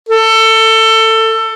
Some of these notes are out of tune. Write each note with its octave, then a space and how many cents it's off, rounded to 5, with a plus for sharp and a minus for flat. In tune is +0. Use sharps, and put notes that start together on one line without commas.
A4 +20